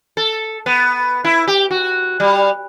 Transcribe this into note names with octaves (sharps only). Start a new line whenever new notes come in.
A4
B3
E4
G4
F#4
G3